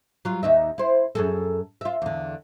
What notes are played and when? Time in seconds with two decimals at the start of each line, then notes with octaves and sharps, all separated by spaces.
0.25 F#3 F4
0.43 D#2 D#4 E5
0.78 E4 C5
1.15 F#2 G#4 A4
1.81 F4 E5
2.02 E2 D3